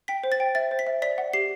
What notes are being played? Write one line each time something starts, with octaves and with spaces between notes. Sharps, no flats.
G5 B6
C5
A6
G5
E5 A6
C5
B6
E5
D5 B6
F#5
G4 C7